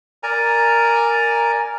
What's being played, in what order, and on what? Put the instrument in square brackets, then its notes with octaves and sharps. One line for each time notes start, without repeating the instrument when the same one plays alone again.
[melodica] A#4 D5 G#5 A#5